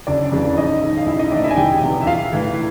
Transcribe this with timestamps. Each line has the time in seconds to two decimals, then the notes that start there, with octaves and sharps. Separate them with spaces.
0.07 F#1 D4 D5
0.32 F2 C#3 E3
0.57 A#1 D#4 D#5
0.82 G#2 D#3
0.98 F5
1.06 A#1 E4 E5
1.19 D#4 D#5
1.32 A2 E3 D4 D5
1.44 E4 E5
1.51 G#5
1.56 E1 G4 G5
1.81 E2 C3 E3
2.02 E5
2.06 A#1 F4 F5
2.32 A2 E3